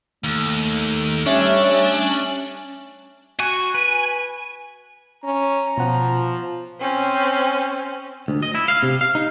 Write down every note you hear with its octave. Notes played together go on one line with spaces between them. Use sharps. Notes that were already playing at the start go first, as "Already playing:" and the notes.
D#2 A3
G3 C#4 D4 E5
F#4 G#5
B4
C#4 A#5
B2 F3 F#5
C4 C#4
D2
D#5
E4
F5
C3
F5
D#4